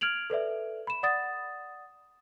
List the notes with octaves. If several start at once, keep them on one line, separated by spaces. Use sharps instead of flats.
F6 G#6 D7 F7 F#7
A4 B4 D5 E5
B5 E7
D5 F#5 D#6 A6